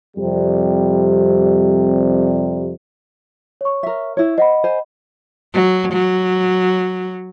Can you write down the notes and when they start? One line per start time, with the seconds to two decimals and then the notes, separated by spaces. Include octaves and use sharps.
0.16 F2 C3 G3
3.61 C#5 C#6
3.83 A#4 E5
4.17 E4 C#5
4.38 C5 D#5 F#5 B5
4.64 C5 G#5
5.54 F#3
5.92 F#3